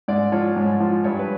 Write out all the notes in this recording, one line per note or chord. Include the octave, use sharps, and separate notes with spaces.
G#2 D5
F3 C#5
G#2
F3
G2 C#5
B4